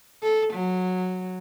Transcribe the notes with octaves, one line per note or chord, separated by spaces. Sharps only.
A4
F#3